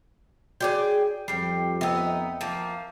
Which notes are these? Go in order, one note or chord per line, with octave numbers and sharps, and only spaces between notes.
F#4 G#4 C#5 D5 G5
F2 G3 G5 C7
B3 D#4 E5 G5 E6
F3 A#3